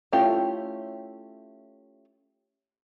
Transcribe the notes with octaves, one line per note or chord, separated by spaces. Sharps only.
A3 C#4 E4 F4 G4